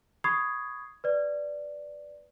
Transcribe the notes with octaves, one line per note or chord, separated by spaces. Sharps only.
B5 C#6 D#6 G#6 C7
B4 D5